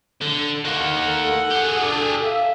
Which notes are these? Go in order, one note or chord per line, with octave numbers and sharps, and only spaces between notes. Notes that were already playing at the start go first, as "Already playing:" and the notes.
D3
D#3 A#3 F#5
A4
G4 G#4
D4
E5 F5